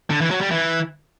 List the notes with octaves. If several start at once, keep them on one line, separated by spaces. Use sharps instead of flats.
D3
E3
F#3
G3
E3